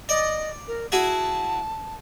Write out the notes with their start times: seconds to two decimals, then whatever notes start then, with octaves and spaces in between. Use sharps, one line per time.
0.09 D5 D#5
0.68 A#4
0.92 E4 F#4 G#4 A5